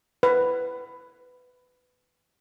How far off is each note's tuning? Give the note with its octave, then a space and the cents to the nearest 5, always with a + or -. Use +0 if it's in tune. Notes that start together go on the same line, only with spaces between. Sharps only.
B4 +15